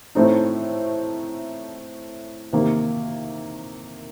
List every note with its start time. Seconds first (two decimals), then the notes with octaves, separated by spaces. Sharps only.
0.15 A2 A3 C4 D#4
2.53 C3 D#3 A#3